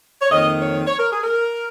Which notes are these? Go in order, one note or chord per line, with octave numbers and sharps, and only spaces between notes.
C#5
F2 D#3 A#3 D#5
C#5
C#5
A#4
G#4
A#4